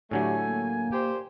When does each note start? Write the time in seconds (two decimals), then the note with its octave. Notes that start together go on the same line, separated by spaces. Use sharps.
0.11 A2 D3 F#3 A3 G4 G#5
0.45 A#3
0.91 A#2 G4 C5